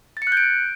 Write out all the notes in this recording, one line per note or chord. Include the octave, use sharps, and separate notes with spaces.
A6
C#7
F#6
G6
D7